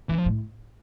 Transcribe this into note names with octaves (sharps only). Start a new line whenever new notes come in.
G2 E3
F3
A2